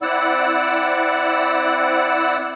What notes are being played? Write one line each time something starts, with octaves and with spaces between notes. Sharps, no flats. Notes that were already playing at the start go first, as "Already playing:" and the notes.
C4 E4 D5 F#5 E6